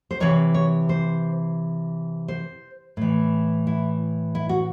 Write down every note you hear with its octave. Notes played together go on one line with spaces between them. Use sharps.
C5
C3 E3 C#5
C#5
C5
C5
A2 E3
E4
E4
F#4